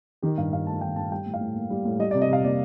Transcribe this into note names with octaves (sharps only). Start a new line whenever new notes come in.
D#3 G4
G2 F5
G2 F5
A3 A5
D#3 G5
G2 A5
G3 G5
A2
F5
A2
A#3
G3
A2
G3 D#5
D5
C3
D#5
C3 F5
A#3 D5